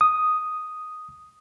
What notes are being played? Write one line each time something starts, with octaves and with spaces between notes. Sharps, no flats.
D#6